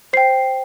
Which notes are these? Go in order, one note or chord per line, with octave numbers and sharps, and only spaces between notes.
C5 G5 C7